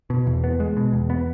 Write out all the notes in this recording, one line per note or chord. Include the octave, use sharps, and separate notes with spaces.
B2
E2
B3
G#3
B2
E2
B3